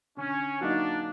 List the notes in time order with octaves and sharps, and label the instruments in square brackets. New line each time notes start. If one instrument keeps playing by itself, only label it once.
[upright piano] D3 [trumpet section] C#4
[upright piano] F#3 A#3 D#4 [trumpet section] D4